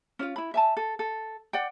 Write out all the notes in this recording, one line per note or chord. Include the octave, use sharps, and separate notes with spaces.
C#4 E4 F4
E4 B5
E5 G#5 A5
A4
A4
D5 F#5 G5